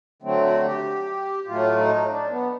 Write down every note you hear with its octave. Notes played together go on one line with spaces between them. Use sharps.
D3 F#3 A3 C4
F#4
G4
A2 F#3 A3 F4
D#4
D4
B3